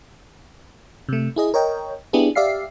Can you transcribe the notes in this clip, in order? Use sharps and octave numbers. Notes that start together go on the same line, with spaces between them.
C3 A3
E4 G#4 D#5
A#4 C#5 D#5 G5
B3 D4 E4 G4 G#4
G4 D5 E5 F5 C7